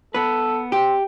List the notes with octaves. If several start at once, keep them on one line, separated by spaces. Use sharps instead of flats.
B3 A4 B4
C4 G4